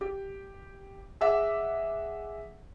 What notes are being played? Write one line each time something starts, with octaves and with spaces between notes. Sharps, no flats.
G4
G#4 D#5 E5 F#5 D6